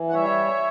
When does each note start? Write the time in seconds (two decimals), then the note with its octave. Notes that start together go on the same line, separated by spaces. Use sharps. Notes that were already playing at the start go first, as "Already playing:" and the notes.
Already playing: E3
0.09 F#5
0.14 G3 C#5 E5